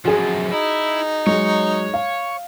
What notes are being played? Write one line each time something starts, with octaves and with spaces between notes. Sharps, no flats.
F#2 F3 F#4 G#4
D#4 E4
F#3 G#3 C#5
F5